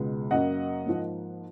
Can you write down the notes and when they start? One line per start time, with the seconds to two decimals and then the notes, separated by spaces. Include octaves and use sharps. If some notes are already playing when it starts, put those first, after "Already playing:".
Already playing: C#2 B2 G#3 B3
0.31 F#2 C#3 F#3 A#3 D#5 F#5
0.87 G#2 F3 A#3